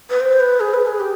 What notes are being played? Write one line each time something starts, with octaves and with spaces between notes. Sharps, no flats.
B4
C5
B4
G#4
B4
G#4
G4